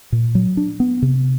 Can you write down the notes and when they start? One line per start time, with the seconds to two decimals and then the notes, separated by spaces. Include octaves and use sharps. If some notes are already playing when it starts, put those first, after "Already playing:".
0.12 A#2
0.35 F#3
0.57 D4
0.80 B3
1.02 C3